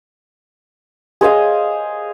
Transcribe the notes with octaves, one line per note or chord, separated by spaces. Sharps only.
G#4 C5 D#5 F5